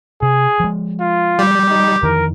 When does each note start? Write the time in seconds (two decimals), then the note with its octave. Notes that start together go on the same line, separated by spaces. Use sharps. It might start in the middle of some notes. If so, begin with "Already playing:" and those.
0.22 C3 G#4
0.60 F3 G#3
1.00 F4
1.39 G3 G4
1.70 D#4
2.03 F2 D#3 E3 A#4